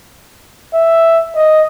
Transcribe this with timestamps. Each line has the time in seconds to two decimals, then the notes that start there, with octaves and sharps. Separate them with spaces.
0.74 E5
1.35 D#5